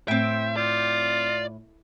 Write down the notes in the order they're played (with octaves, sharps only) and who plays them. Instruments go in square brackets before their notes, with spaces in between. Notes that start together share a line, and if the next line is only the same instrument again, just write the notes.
[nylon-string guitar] A2 [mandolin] C4 G5 [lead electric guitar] E5
[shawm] F4 [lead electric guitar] D5